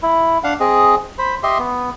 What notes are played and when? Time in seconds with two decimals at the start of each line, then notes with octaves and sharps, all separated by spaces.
0.03 E4
0.44 D4 F5 F#5
0.60 C4 G#4 D#5
1.19 C5 B5
1.43 G4 D#5 E5 C6
1.59 B3